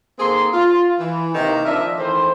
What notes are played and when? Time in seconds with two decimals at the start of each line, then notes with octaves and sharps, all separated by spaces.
0.19 D#3 A#3 C4 G#4 A4 C6
0.53 F4
1.00 E3
1.34 C3 D#3 A#3
1.65 F3 D4 A#4 D#5 E5
1.98 D#3 E3 A3 C4 C5